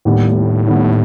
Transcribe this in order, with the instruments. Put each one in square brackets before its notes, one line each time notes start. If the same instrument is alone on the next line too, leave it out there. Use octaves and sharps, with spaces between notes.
[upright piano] D#2 D#3 G3 B3 [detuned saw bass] A2
[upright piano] D#2 D#3 G3 B3